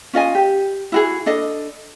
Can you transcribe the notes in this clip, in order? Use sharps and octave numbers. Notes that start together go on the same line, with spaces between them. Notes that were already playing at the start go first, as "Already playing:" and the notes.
C#4 F4 D#5 G#5
G4
E4 F#4 G#4
D4 A4 D#5